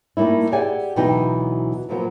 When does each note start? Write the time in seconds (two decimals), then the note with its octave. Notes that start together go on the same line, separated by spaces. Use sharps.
0.17 G3 A3 A#3 D#4 E4
0.52 G4 G#4 D5 E5 F#5 G#5
0.96 D2 B2 E3 F#3 D#4 G5
1.89 A#2 F3 F#3 A#3 B3